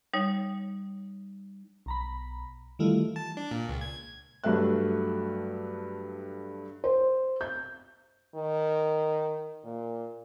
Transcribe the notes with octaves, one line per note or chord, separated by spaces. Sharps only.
G3 D#4 C#5
B1 A#5 B5
D#3 E3 G3 A3 E4 F4
A5
D4
A#2
C#2
G#6
G2 F#3 A3 E5 F#6
C5
G6
D#3
A#2